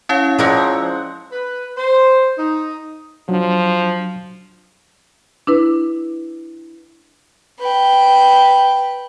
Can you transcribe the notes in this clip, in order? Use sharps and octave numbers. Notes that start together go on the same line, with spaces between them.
C#4 E4 C#5 F5
F3 G#3 C4 A#4 D5 F#5
B4
C5
D#4
F3 F#3 D4
D4 E4 B4
B4 G5